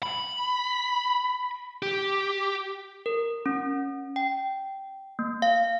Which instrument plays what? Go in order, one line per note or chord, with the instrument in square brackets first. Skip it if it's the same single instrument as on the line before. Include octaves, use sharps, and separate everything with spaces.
[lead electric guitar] B5
G4
[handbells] A#4
C#4
G5
A#3
F5